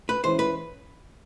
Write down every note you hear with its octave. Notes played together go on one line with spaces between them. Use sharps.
B4
E3 G#3 C#4 E4 C5
B4